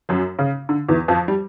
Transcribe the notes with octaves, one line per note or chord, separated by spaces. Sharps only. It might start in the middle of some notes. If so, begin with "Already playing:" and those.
F#2 F#3
C#3
D3
E2 E3
F2 F3
G3